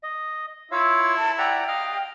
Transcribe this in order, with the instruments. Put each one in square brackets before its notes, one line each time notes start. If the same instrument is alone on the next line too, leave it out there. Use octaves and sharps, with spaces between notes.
[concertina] D#5
[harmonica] E4 E5 [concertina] F4 C#5 F5
[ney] A5
[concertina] D5 F#5 A#5 [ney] G5
[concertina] D#5 F5 F6